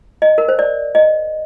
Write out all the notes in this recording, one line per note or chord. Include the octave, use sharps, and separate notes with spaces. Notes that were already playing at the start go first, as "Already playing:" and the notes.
D#5
A#4
C5
D5
D#5